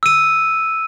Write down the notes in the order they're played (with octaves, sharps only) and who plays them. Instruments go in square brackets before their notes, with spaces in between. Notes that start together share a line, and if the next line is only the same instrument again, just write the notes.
[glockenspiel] E6 D#7